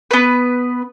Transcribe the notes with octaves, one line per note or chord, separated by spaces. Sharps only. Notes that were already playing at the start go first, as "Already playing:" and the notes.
B3 B4